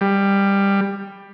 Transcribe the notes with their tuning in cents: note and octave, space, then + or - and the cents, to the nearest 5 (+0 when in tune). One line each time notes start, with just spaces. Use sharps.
G3 +15